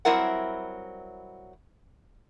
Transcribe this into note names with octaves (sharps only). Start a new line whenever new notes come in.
F#3 G3 C4 E4 A#4 F#5